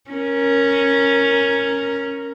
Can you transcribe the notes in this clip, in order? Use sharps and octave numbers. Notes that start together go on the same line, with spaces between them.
C#4 A#4